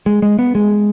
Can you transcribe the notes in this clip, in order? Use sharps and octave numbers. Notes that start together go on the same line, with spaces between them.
G#3
G#3
B3
G#3